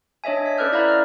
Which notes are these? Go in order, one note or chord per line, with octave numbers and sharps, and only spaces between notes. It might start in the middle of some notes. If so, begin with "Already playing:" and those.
D4 C#5 D#5 E5 G#5
B6
C#4 A4 B4 D5 F6 G6
E4 D5 E5 F5 A#5 B5
A#5 F6